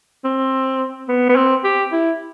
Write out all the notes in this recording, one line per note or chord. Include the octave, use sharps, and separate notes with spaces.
C4
B3
B3
C4
G4
E4